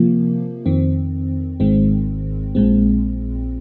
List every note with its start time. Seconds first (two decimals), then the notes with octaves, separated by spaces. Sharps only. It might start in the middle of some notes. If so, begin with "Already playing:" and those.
Already playing: C3 F3 A#3
0.66 F2 D#3 C4
1.60 G#1 G#2 D#3 G#3 C4
2.55 A#1 A#2 G#3 C4